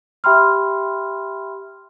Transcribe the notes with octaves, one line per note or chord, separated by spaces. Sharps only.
G4 E5 G5 B5 C6 F6